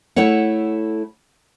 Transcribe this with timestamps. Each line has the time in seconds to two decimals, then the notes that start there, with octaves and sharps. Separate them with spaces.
0.16 A3 E4 A4 C#5 F#5